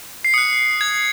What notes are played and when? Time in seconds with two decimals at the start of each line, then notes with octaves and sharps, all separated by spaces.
0.25 C7
0.34 D#6 F#6 C#7
0.81 G#6